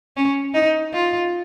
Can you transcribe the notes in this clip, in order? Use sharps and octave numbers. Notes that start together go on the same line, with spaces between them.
C#4
D#4
F4